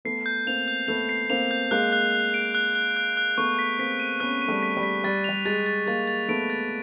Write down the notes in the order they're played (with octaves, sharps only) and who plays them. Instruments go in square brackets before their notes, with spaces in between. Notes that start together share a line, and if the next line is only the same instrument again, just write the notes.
[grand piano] A3 B3 [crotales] C7
[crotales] G6
[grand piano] A#3 C4 [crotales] F7
[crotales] G6
[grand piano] A3 B3 [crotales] F7
[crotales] C7
[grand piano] A#3 C4 [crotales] F7
[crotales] G6
[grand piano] G#3 A#3 [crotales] F#6
[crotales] F#6
F#6
D7
F#6
F#6
F#6
F#6
[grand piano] A3 B3 [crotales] C#6
[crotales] B6
[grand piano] A#3 C4 [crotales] B6
[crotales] D#7
[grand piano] B3 C#4 [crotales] F#6
[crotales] D#7
[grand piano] G3 A3
[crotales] B6
[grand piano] G3
[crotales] B6
[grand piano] G3 [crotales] A6
[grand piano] G3 [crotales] F7
[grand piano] G#3 [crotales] A6
[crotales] A6
[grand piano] G#3 A#3 [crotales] A6
[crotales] A6
[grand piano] A3 B3 [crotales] D7
[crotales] A6